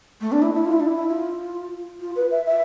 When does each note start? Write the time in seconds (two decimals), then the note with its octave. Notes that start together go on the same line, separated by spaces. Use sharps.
0.21 A3
0.32 D4
0.42 E4
0.55 E4
0.65 F4
0.73 E4
0.80 D4
0.87 E4
1.10 F4
2.00 F4
2.16 B4
2.31 E5
2.46 E5